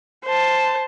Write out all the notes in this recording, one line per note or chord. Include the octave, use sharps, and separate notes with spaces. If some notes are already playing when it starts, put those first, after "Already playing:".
C5 A5